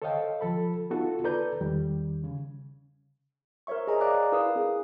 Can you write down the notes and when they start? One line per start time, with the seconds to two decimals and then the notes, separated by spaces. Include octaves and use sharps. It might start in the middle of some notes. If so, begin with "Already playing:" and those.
0.02 A4 C5 C#5 D#5 F5 G5
0.41 F3 A4 B5
0.90 B3 D#4 F4 F#4 A4
1.24 A4 B4 D5 A#5 G6
1.61 E2 D#3 G3
2.24 C#3
3.67 A#4 C5 C#5 E5 C#6
3.87 G#4 D#5 G#5 A#5
4.01 D5 F5 A#5 D6 F#6
4.32 E4 A#4 B4 F5 D#6
4.56 C4 G#4